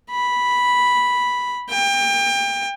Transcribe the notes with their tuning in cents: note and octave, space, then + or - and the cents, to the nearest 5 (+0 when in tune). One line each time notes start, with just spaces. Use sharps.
B5 -5
G5 +30